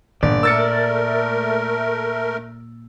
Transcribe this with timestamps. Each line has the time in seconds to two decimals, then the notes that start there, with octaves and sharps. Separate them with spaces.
0.23 G1 A#2 D5
0.43 A3 A#4 E6 A6 C#7